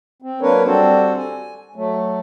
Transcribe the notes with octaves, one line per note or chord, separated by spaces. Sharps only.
C4
F#3 A#3 D4 A#4 B4 C#5
G3 C4 D4 F#4 A4 C5
G#5
F#3 A3